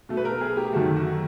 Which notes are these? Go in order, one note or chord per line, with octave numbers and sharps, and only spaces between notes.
B2 F#3 A3
B4
A#4
G#4
G4
F#2 D#3 F#3 A3 F#4
F#4